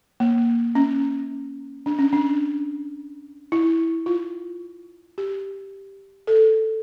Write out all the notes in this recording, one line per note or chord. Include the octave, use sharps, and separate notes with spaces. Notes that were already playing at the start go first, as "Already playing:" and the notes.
A#3
C#4
D4
C#4
D4
E4
F4
G4
A4